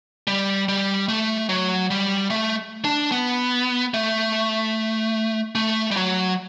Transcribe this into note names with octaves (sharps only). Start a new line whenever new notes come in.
G3
G3
A3
F#3
G3
A3
D4
B3
A3
A3
G3
F#3